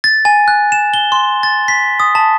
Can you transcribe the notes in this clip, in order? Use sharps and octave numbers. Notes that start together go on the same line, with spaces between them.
A6
G#5
F#6
E7
G7
C6
A6
B6
D#6
A5